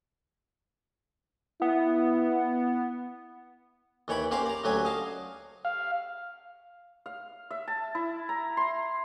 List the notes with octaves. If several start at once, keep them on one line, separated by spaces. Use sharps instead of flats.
B3 E4
D#2 E3 C#5 G5 B5
A#3 C#4 G4 C5 F5 G5
D5 A#5
D2 F#3 C#4 G4 G#5
D#5 F5 A5
F5
F5
E5
A5
E4
A#5
C6